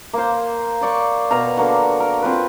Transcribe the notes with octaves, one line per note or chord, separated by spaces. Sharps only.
A#3 C5
C5 D5 C#6
B2 F5 A#5
D3 A#3 F#4
A#4
C4 F4 B4